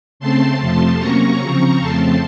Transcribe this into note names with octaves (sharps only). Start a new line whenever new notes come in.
C#3 A3 C4 A5 C6
F2 C3 F3 A3 A5 C6
C3 F#3 A#3 C#4 A#5 C#6
C#3 F3 C4
F2 C#3 F3 A3 C4 A5 C6